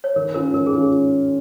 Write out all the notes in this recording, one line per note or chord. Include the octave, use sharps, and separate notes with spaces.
C#5
D#3 A#4
C#4 F4 A#4
D#3 A#4
G#4
C#4 F4